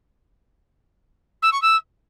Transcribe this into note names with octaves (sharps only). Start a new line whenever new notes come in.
E6
C#6
E6